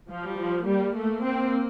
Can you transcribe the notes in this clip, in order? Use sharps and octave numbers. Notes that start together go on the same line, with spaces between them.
F3
G3
F3
G3 A#3
A3
C4